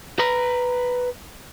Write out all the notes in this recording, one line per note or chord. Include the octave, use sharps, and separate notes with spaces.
B4 A#5